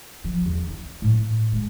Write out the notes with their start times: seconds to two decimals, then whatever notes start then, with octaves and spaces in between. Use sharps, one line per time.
0.24 F3
0.46 E2
0.68 E4
1.02 A2
1.52 G#3